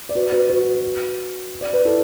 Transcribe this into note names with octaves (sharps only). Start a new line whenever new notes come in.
D5
F#4 B4
F#4 B4
F#4 B4
D5
B4
E4 A4